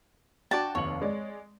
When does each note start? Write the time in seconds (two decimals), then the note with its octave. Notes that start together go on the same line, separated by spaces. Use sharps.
0.51 D4 F#4 D5 G5 A5
0.75 F1 D#2 C#5 F#7
1.02 G#3 D5